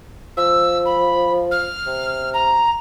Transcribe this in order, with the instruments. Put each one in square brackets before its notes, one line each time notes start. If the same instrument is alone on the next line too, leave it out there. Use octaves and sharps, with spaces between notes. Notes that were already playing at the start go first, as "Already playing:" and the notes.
[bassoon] F3 [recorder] E6
[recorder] B5
F6
[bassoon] C3
[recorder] A#5